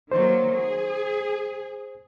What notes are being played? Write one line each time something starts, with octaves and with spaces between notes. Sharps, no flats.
D#3 F#3 A#3 C5
G#4